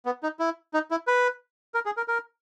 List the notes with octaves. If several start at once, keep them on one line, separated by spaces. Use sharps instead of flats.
B3
D#4
E4
D#4
E4
B4
A#4
G#4
A#4
A#4